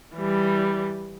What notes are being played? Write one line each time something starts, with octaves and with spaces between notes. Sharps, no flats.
E3 G3